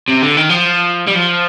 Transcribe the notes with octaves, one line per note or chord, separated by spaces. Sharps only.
C3
D3
D#3
F3
G3
F3